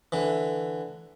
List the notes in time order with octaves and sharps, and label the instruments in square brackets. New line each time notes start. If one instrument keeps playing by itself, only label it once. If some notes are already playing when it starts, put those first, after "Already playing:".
[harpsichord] D3 E3